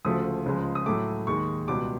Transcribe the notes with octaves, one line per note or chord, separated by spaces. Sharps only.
D2 C#3 F3 A3 D#6
C#2 C#3 F3 G#3
D#6
A2 F#3 A3 D6
D#2 D#3 G#3 C#6
C#2 B2 G3 D6